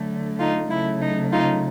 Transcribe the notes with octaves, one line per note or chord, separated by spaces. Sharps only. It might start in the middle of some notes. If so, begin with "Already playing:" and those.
Already playing: D3 F#3 A3
D#4 F4
C#3 F#3 A3 E4
D#4
D#4 F4